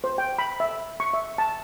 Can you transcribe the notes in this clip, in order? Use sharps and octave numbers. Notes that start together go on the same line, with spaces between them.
C5
G5
B5
E5
C#6
E5
A5